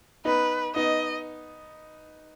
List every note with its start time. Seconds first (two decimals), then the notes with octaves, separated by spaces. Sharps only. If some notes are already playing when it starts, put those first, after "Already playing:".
0.25 B3 D#4 B4
0.75 B3 D#4 D#5